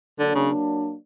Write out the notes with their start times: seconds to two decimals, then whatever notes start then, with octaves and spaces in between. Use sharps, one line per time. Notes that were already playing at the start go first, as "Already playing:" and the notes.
0.19 D3 F#3 A#3 D4
0.35 C#3